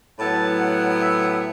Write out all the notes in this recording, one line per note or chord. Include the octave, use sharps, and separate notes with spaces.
A2 F#3 B3 E4 A5
F#5
E5